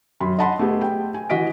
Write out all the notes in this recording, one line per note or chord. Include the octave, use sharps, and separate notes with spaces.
F#2 B5 C6
D#5 F#5 A5 B5 C6
A3 B3 G4 G#4
G5
G#5
E3 F#4 D#5 B6 D7